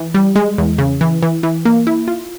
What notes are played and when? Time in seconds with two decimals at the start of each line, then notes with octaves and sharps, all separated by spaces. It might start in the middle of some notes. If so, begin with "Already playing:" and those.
Already playing: E3
0.14 G3
0.36 G#3
0.58 E2
0.78 C#3
1.01 E3
1.23 E3
1.43 E3
1.65 A#3
1.87 E4
2.08 F4